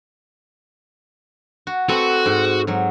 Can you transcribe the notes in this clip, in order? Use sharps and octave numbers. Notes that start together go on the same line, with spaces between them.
F#4
C4 F#4 A4 B4
G#2
G#2 F#3